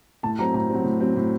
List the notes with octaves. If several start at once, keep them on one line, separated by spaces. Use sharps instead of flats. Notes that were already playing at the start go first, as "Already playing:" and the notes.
A2 A5
F#3 C4 A#5
A2 A#5
F#3 C4
A2
F#3 C4
A2